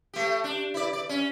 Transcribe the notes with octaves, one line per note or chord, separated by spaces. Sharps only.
A3 G4
D4
E4 D5
D5
C#4